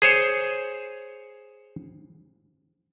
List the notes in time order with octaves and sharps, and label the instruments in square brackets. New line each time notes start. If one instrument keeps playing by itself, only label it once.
[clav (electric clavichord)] G#4 C5 C#5